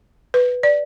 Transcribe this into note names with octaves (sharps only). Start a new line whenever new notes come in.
B4
D5